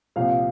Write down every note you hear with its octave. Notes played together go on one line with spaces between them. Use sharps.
C2 A#2 F3 F5